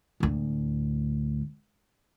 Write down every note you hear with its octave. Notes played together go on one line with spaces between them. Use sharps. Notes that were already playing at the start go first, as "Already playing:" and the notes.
D2 A2